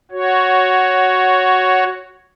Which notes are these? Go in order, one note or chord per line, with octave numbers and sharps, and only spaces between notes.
F#4 C#5